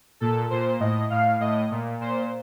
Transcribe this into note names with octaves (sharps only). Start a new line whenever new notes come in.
A#2 A4
A#2 C5
A2 D#5
A2 F5
A2 D#5
A#2
A#2 C5